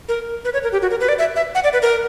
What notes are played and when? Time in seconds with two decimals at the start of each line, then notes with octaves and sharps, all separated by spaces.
0.09 A#4
0.45 B4
0.53 C#5
0.63 A#4
0.72 G4
0.82 F#4
0.91 A#4
1.00 B4
1.09 D5
1.19 E5
1.36 E5
1.55 F#5
1.64 D5
1.73 B4
1.82 A#4